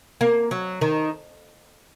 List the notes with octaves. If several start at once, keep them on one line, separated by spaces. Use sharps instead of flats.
A#3
F#3
D#3